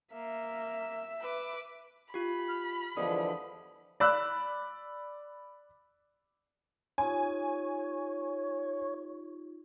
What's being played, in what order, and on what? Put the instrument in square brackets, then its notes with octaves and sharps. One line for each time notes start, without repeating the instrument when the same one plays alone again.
[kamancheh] A#3 [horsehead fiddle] E5
[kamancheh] B4 D6
[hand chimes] F4 G4 [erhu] B5
[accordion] F6
[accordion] E2 D3 F3 [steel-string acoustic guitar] G3 G#3 B3 [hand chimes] D#6
[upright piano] D5 B5 E6 F#6
[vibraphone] D#4 F4 G4 [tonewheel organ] C#5 [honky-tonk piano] G#5